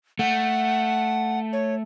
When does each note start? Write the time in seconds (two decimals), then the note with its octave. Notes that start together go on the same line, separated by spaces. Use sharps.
0.19 A3 F#5
1.53 C#5